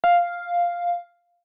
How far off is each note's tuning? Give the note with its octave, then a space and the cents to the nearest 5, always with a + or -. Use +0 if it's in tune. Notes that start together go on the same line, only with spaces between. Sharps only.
F5 +0